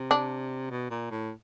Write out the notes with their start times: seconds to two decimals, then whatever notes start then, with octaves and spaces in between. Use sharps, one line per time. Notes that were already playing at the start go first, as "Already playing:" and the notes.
Already playing: C3
0.11 D4
0.70 B2
0.91 A#2
1.11 A2